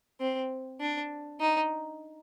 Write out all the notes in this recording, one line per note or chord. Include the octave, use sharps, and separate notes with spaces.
C4
D4
D#4